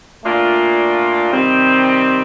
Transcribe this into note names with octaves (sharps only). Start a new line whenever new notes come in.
A#2 A3 D4 F4
C3 D#3 G3 C4